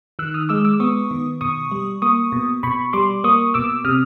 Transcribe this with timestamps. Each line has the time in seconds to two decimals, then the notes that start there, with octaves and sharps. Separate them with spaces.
0.19 D#3 E6 F#6
0.34 D#6 F6
0.49 G#3 D6 E6
0.64 D6 E6
0.80 B3 C#6 D#6
1.11 D#3
1.41 B2 C#6 D#6
1.71 G3
2.02 A#3 C#6 D#6
2.32 B2
2.63 B2 B5 C#6
2.93 G3 C6 D6
3.24 A#3 C#6 D#6
3.54 B2 D6 E6
3.85 C3 D#6 F6